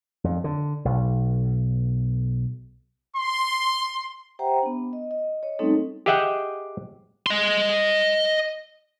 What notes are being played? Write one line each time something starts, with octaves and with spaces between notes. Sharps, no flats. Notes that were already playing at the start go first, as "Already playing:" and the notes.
F2
D3
B1
C6
G4 C5 E5 F#5 G5 A#5
B3 D4
D#5
D#5
C#5 D#5
G3 A3 C4 C#4 D#4 A4
G4 G#4 D#5 E5 F#5 G5
D#5 C6